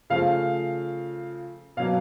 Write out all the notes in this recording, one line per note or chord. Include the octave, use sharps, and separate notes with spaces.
C#3 F3 A3 F5
B2 F#3 A#3 F5